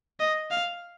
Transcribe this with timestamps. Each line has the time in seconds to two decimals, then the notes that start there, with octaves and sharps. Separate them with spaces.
0.20 D#5
0.51 F5